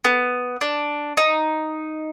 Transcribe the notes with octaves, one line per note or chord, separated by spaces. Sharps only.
B3
D4
D#4